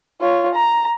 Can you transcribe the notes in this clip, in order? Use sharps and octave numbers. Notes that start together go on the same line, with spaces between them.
F4 C#5
A#5